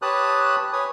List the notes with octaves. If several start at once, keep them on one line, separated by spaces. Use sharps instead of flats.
G4 B4 C#5 A5 D#6 F#6
B4 C#5 G#5 D#6